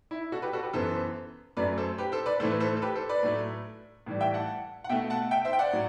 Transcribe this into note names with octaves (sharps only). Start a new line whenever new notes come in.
E4
F#4 A4
G4 B4
F#4 A4
G4 B4
F#2 E3 B3 A4 C5
F#2 F#3 A3 B4 D5
A4 C5
G4 B4
A4 C5
B4 D5
A2 E3 A3 A4 C5
B4
A4 C5
A4
G4 B4
A4 C5
B4 D5
A2 F#3 A3
A2 E3 G3
E5 G5
F#5 A5
F#5
B2 A3 E5 G5
F#5 A5
E5 G5
C5 E5
G5
D5 F#5
A2 F#3